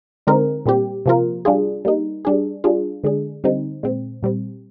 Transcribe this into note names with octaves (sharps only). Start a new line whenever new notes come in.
D3 G#3 C4 D#4 A#4
A#2 G3 C4 G4
C3 F3 A#3 F4 A#4
G3 D4 F4 G#4
G3 A#3 D#4
G3 D4 G#4
G3 D4 F4 G#4
D3 G#3 D4 G#4
D3 G3 C4 D#4
A#2 G#3 C4
A#2 G3 C4